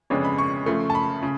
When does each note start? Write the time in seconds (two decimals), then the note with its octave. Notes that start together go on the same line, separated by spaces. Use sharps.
0.10 F2 C#3 G#3 B3 D4 C#5
0.25 B5
0.38 C#6
0.66 C#3 F3 A3
0.90 A5
0.95 B5
1.23 C#3